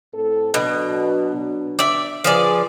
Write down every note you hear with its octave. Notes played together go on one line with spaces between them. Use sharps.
A2 C4 A4
B2 F#3 B3 D4
D5 E5
F3 F4 G#4 B4 D5